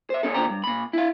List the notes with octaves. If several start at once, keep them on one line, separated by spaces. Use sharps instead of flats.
C5 E5
A#2 C#4 A4
D#2 A#2 D3 C5 G5 A#5
G2
A#2 B5
E4 F5